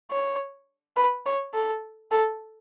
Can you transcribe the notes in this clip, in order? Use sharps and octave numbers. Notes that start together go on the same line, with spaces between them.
C#5
B4
C#5
A4
A4